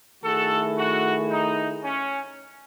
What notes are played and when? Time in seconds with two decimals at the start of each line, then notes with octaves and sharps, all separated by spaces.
0.24 D#3 A3 E4 F#4 G#4 A4
0.77 F#4
1.30 D#4
1.84 C#4